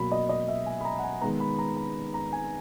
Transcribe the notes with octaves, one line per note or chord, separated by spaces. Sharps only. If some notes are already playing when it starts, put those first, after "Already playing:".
Already playing: B2 F#3 A#3 B5
D#5
D#5
E5
G#5
B5
A#5
F#5
G#5
D#3 G#3 B3 A#5
B5
A#5
B5
A#5
G#5